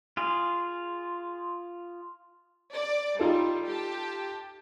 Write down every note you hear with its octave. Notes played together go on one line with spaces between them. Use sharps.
F4 G#4
D5
G3 D#4 F4 A4
G4 A5